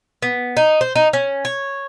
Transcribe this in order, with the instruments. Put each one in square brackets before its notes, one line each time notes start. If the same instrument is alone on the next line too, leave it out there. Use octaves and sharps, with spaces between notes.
[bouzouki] B3
D#4
C5
D#4
C#4
C#5